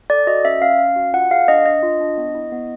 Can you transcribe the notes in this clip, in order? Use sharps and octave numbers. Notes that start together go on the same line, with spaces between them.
A4 D5
F#4 D#5
C#4 E5
C#4 F5
C#4
F#4
F4 F#5
G#4 F5
D4 D#5
D4 D#5
F4
D4
B3
E4
B3